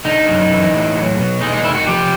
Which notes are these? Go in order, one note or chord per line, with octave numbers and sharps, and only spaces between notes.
D3 D#4
F#2
E3
A2
F#3
B2
G#3 D#4
D#4
D#3 E4
F#4
F3 G4